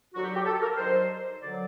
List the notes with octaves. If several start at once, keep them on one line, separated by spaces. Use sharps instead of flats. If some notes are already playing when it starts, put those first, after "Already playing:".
D#2 D3 F#3 F#4
G4
F#4
G4
A4
A#4
G2 D#3 F#3 C5
D2 D3 F#3 D5